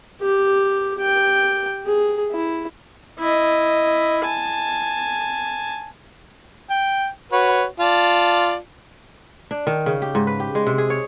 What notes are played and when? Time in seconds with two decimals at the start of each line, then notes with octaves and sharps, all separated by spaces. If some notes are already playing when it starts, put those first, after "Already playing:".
0.21 G4
0.99 G4 G5
1.86 G#4
2.32 E4
3.19 E4 D#5
4.24 G#5 A5
6.70 G5
7.32 F#4 B4 C#5
7.80 F4 D5 A5
9.51 D4
9.67 D#3
9.86 C#3
10.02 G4
10.15 G#2
10.27 B4
10.40 G4
10.55 G#3
10.67 C3
10.78 G#4
10.90 C#5